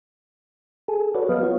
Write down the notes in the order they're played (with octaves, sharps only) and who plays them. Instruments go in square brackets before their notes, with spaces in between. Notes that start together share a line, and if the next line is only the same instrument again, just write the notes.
[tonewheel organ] G#4 A4
F#4 A4 B4 C#5 D5
F#3 B3 B4 D#5 F5
B3 F4 F#4 C#5